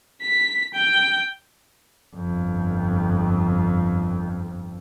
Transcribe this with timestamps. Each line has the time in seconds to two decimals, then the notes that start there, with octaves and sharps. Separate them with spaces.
0.21 B6
0.74 G5
2.16 G1 F2